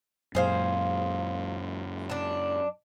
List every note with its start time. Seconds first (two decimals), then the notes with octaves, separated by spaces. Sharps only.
0.35 F#2 A#2 G#4 C5 F5
2.10 D4 A5